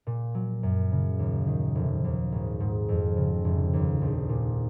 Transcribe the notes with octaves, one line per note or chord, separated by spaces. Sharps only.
A#2
F#3
F#2
C#3
D#2
D#3
F1
D#2
G#1
G#2
F2
C#3
F1
D#2
A#1
A#2